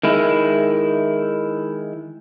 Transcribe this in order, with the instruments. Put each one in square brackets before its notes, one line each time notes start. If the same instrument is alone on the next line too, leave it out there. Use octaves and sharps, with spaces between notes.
[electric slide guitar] D#3 G#3 E4